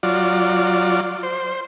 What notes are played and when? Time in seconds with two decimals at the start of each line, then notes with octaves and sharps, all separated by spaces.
0.03 F#3 F4 D5
1.23 C5